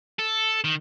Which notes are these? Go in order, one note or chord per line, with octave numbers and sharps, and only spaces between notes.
A4
D#3